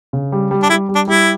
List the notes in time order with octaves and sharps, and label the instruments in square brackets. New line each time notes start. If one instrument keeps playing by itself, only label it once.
[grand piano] C#3
G3
G3
[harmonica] D4
[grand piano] G3 [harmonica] E4
[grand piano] G3
[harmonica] D4
[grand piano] G3 [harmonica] E4